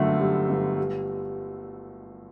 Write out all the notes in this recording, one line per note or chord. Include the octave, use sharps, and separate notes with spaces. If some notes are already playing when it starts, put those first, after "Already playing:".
Already playing: G1 F#2 D3 A3
G3
G1
G3